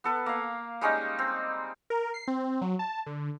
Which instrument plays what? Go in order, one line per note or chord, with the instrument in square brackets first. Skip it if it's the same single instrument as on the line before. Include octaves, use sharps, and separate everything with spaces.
[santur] B3 A4 B4
A#3 F5
G3 G#3 C#4 D#4
C4
[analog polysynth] A#4
C7
C4
F#3
A5
D3